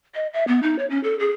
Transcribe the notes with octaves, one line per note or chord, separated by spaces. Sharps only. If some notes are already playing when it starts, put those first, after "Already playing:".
D#5
E5
B3
D#4
C#5
C#4
A4
G#4